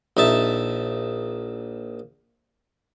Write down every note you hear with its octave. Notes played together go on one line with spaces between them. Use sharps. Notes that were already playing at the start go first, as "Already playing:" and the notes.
A#1 D#4 E5 A5